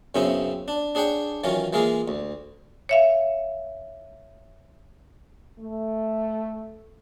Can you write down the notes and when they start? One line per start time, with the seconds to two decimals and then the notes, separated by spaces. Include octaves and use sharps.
0.15 F#2 C#3 B3 C4 D#4 E4
0.68 D4
0.95 D4 G#4 C#5 F#5 G5
1.44 D#3 E3 F#3 C#4 F4
1.73 E3 G#3 A#3 F4 G#4
2.08 D2
2.89 C#5 E5 F5
5.58 A3